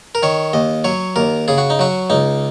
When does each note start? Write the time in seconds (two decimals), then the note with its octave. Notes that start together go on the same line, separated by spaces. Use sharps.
0.15 A#4
0.23 D#3 C#5
0.53 D#2 D#5
0.84 F#3 C#5
1.16 D#2 A#4
1.48 C#3 G#4
1.58 F#4
1.70 D#4
1.79 F#3 F#4
2.10 C#2 D#4